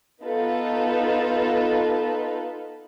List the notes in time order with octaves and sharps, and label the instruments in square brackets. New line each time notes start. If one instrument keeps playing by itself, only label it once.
[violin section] B3 D#4 F4 A4 B4